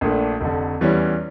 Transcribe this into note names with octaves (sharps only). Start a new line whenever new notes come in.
A#1 A#2 A3 D4
F1 F2 D3
E2 E3 G3 C#4